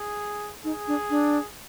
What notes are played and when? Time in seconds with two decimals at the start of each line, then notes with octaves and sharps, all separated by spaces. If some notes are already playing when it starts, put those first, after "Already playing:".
Already playing: G#4
0.64 D#4 G#4
0.88 D4
1.10 D4